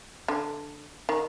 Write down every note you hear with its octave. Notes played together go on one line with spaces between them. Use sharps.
D3
D#3